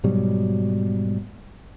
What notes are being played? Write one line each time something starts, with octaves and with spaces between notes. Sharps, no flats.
G#2 B2 F#3 G3